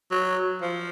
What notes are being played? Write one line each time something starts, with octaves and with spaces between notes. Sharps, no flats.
F#3
F3